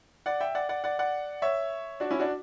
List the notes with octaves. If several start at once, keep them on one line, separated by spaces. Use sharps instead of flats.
D5 F#5
E5 G5
D5 F#5
D5 F#5
D5 F#5
D5 F#5
C#5 E5
D4 F#4
C#4 E4
D4 F#4